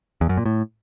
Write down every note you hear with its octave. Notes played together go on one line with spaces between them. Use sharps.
E2
F#2
A#2
A2